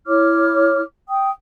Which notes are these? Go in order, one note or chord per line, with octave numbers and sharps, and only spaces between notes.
E4 C#5 D6 F6
G5 D#6